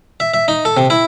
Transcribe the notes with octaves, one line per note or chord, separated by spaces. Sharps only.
E5
E5
D#4
A4
C3
E4